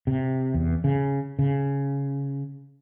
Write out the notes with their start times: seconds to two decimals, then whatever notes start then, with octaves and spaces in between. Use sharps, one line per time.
0.07 C3
0.54 E2
0.84 C#3
1.39 C#3